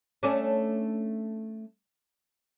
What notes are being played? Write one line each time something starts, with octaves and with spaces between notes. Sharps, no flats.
A3 C#4 D4